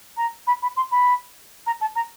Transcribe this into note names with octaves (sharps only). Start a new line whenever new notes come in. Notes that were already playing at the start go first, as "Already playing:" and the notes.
A#5
B5
B5
C6
B5
A#5
A5
A#5